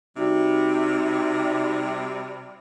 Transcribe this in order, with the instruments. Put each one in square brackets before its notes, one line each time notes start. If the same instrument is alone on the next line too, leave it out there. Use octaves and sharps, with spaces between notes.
[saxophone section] C3 G3 [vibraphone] D#4 F#4